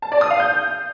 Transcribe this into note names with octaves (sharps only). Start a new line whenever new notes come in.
A5
D5
D#6
F5
G6